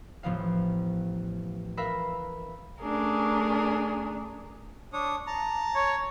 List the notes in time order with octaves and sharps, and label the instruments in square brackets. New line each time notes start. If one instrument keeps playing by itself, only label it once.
[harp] A1 F3 B3 F5
A#4 B4 E5 F5 B5
[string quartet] A3 C#4 D4 G#4 A#4
[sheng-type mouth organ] D4 C#5 D#6
A5 A#5
[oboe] C#5